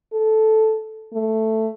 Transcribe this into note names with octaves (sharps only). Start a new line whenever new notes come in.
A4
A3